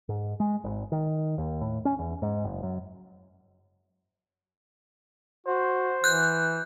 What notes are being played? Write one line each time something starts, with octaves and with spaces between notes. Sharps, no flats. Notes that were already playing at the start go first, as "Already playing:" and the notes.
G#2
G#3
G#1
D#3
D#2
A2
C#4
E2
G#2
F#1
F#2
F#4 C5
E3 F#6 G6